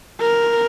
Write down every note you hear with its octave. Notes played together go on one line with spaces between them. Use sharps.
A#4